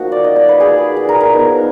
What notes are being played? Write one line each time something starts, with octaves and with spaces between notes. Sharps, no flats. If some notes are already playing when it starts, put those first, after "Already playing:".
Already playing: F3 A#3 D#4 F#4
D5
D#5
D5
B4
G#4
G#4
A#4
A#4
F3 B3 D#4